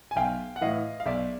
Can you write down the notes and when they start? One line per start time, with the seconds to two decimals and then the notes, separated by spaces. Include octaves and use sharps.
0.11 G#5
0.16 B1 F5 G5
0.56 F#5
0.61 A2 E3 D#5 F5
1.00 F5
1.06 B1 D5 E5